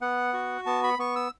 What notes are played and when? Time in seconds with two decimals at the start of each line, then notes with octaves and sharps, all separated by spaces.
0.01 B3 F#5
0.33 F#4
0.66 B3 A5
0.84 B5
0.99 B3 C#6
1.16 E6